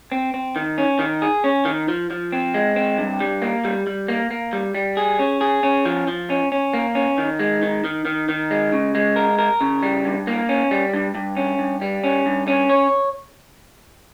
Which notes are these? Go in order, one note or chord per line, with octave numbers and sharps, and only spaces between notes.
C4
C4
D#3
C#4
D#3
G#4
C#4
D#3
F3
F3
C4
G#3
C4
G2
G3
A#3
G3
G3
A#3
A#3
G3
G3
G#4
C#4
G#4
C#4
F3
F3
C#4
C#4
A#3
C#4
D#3
G#3
D#3
D#3
D#3
D#3
G#3
C#3
G#3
A#4
A#4
C#3
G3
G2
A#3
C#4
G3
G2
G2
C#4
G2
G3
C#4
G2
C#4
C#5